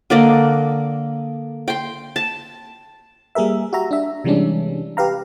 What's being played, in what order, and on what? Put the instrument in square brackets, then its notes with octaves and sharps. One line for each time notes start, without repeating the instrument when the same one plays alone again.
[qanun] D3 A#3 D5 D#5
G5 C6
A5
[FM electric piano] G3 A#3 G#4 A#4 E5
F#4 G4 E5 A#5
D4 E5
C3 E3 G3 G#3 C#4 D4
G4 B4 F5 A#5